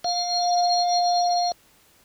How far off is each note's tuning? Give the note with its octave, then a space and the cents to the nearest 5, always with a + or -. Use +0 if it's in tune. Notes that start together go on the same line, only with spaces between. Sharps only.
F5 +20